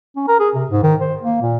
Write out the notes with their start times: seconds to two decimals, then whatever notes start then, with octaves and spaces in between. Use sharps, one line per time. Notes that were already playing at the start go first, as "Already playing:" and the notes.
0.16 C#4
0.28 A#4
0.40 G#4
0.55 C3
0.70 G#2
0.83 D#3
1.01 C5
1.22 A#3
1.42 A#2